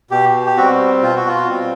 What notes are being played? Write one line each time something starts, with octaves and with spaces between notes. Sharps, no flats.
B2 G4
G4
G3 C4 F#4
B2 F4
F#4
F4
G3 C4